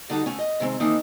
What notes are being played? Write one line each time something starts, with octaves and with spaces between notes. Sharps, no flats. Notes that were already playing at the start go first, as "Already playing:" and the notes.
D3 G3 D#4 F#4 A4
D3 A3 C#4
D#5
C3 D#3 G#3 C4
D#3 E3 A#3 C4 D4 D#4